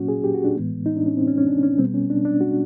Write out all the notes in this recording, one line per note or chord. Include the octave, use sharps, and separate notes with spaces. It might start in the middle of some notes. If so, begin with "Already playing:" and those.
Already playing: A#2 F#3 A#3 C#4 F#4
G#4
G4
F#4
D4
A2 E3 G#3 B3
D#4
D4
C#4
C4
C#4
C#4
D4
C#4
B2 G3 B3 C4
C#4
D4
D4
F#4